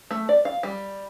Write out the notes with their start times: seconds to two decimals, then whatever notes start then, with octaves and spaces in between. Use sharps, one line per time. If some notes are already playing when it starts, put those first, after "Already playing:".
0.11 A3
0.29 D5
0.45 F5
0.63 G3